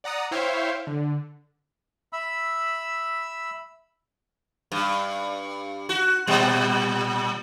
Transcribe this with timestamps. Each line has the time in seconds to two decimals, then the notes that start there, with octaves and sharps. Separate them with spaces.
0.04 D5 F#5 A#5 D#6
0.31 E4 C5 C#5 E5 F5 G5
0.87 D3
2.13 E5 B5 E6
4.72 G2
5.89 F#4
6.27 A#2 G3